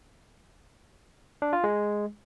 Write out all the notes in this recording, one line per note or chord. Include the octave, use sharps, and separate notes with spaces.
D4
F4
G#3